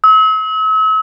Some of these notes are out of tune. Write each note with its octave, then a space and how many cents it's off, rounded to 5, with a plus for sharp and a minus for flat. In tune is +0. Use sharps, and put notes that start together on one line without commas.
E6 -40